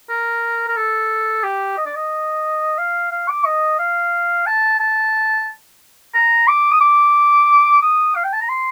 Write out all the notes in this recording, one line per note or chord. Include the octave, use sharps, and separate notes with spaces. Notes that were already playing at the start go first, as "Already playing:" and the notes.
A#4
A#4
A4
G4
D#5
D5
D#5
F5
F5
D6
D#5
F5
A5
A5
A#5
D6
D#6
D6
D#6
F5
G5
A5
A#5
C6